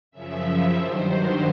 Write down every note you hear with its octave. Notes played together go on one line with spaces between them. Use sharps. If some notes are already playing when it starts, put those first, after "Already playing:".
F#2 C#3 F3 E5
G2 D#3 F#3 C5